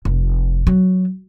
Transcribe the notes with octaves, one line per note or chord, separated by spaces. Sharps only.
F1
F#3